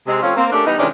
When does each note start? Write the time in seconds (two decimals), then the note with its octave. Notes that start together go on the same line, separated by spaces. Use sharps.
0.07 C3 G#3 C4
0.22 F3 A3 C4 C#4 F4 C#5
0.36 A#3 C4
0.53 A3 C#4 D4 G4 A4 A#4
0.67 E3 G3 B3 D#4
0.79 C3 D#3 E3 G#3 C#4 D4